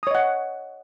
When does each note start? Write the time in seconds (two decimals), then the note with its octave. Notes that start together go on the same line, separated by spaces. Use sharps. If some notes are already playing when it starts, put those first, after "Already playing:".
0.03 D#6
0.07 C#5
0.11 D#5
0.15 F#5